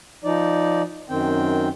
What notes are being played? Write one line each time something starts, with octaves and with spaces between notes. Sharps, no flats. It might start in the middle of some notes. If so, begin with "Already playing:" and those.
F3 D#4 D5
F#2 D#3 C4 G5